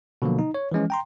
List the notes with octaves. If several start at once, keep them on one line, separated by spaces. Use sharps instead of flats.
B2 D3 F3 F#3 A#3
D#4
C#5
E3 F3 G#3 C#4
G5 A#5 C6